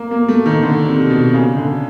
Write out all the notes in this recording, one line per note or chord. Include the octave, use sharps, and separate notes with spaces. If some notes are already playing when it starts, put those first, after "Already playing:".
Already playing: A#3
A#3
A3
D#3
D3
C3
B2
C#3
D3